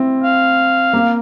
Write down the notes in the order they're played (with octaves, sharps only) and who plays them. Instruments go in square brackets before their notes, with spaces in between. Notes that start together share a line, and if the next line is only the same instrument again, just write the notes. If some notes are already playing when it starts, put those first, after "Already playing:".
Already playing: [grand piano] C4 E4
[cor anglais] F5
[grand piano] A#3